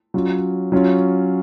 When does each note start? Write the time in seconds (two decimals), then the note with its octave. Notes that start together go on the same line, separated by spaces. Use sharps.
0.14 F#3 C#4 F4
0.72 F#3 C#4 F4